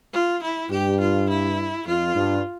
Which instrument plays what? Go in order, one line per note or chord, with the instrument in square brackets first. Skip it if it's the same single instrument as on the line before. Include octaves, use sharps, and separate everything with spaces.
[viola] F4
E4
[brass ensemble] G2 [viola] G4
[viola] F4
E4
[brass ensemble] F2 [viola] F4
[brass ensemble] G2